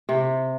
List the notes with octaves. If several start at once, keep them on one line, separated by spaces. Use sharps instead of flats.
C3